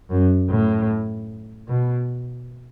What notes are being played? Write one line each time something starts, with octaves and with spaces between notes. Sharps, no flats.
F#2
A2
B2